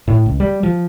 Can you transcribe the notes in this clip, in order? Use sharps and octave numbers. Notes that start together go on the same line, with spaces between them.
A2
C#2
G3
F3